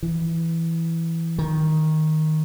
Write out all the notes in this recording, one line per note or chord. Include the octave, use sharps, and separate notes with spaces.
E3
D#3